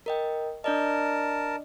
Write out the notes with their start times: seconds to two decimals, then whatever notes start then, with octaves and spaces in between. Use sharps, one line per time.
0.06 A#4 D#5 G5
0.64 D4 A#4 D5 D#5 A5